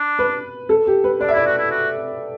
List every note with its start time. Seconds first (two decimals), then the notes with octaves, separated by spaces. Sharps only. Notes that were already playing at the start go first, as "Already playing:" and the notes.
Already playing: D4
0.19 B4
0.69 A4
0.87 G4
1.04 B4
1.20 D4 D5
1.28 E5
1.33 E4
1.37 D5
1.46 F#4
1.58 E4
1.71 F#4